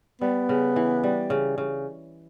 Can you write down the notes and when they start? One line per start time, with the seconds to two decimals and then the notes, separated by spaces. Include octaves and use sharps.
0.21 G3 B3
0.49 C#3
0.76 E3
1.03 G3
1.30 C#3
1.58 C#3